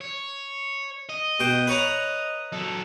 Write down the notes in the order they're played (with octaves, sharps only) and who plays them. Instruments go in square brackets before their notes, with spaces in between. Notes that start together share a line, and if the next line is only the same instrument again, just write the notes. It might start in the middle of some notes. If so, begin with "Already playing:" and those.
[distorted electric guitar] C#5
D#5
[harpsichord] B2 G5
B4 C#5 A#5
[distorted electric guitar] F#3 A4